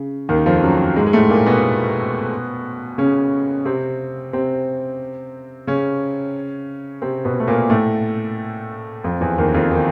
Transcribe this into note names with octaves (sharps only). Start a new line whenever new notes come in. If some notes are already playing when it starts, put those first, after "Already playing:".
Already playing: C#3
D#2 D#3
F2 F3
F#2 F#3
G#2 G#3
G#3
A2 A3
A#2 A#3
B2 B3
C#3 C#4
C3 C4
C3 C4
C#3 C#4
C3 C4
B2 B3
A3
A#2 A#3
A2 A3
F2 F3
E2 E3
D#2 D#3
F2 F3
D#3